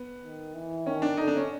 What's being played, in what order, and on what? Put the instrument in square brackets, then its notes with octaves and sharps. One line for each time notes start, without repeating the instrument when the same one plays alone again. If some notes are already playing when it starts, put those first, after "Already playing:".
Already playing: [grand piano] B3
[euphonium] D#3
E3
[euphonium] D#3 [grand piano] C#4
[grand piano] D4
[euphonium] D3 [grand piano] D#4
[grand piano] D4
C#4